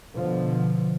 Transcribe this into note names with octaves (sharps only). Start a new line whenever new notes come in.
B2 D3 F3